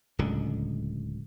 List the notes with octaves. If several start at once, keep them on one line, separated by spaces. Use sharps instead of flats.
D1 C#2 D3